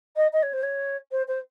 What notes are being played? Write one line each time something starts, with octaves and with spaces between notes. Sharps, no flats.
D#5
D#5
C#5
C5
C#5
C5
C5